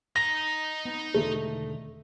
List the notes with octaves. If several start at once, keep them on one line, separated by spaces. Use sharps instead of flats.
D#4 A#5 A#6
B3
E1 D3 D#3 A3